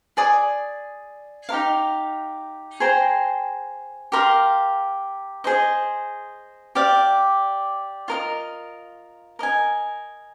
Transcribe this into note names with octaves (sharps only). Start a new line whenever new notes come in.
G#4 D5 G#5 D#6
D#4 G4 A#4 F5
G#4 C5 G5 A#5
G4 A#4 F5 C6
G#4 C5 D#5
G4 D5 F5
F4 A#4 D#5
A#4 D#5 G#5